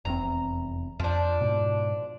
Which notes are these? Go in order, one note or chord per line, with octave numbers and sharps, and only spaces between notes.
F1 E2 C4 A#5
F2 F3 D4
G#2 B2